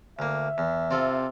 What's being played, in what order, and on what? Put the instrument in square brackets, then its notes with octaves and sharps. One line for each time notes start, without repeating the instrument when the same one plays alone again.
[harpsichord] D2 A#3 [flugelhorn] E5
[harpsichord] E2
[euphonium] C3 [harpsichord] C4 F4 A4